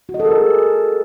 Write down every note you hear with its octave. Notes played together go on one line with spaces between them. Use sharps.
F#4
D#5
A4
A#4
G#4